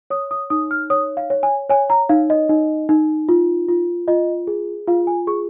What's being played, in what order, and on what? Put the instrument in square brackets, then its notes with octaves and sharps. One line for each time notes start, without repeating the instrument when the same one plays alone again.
[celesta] C#5 D#6
D#6
D#4 D#6
F6
C#5 D#6
F5
C#5
G#5
C#5 G#5
A#5
D#4 F5
D#5
D#4
D#4
F4
F4
F4 D#5
G#4
F4 F5
G#5
G#4 C#6